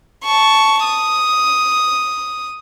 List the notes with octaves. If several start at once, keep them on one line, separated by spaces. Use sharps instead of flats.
A5 C#6
D#6